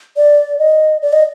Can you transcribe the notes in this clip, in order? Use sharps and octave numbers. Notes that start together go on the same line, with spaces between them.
D5
D#5
D5
D#5